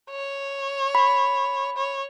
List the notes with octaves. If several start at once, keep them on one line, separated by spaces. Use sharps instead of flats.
C#5
B5
C#5